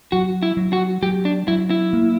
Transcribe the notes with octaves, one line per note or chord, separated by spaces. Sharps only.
F#3 F#4
E4
F#3
F#4
F#3 G4
D4
F#3 E4
E4
A#3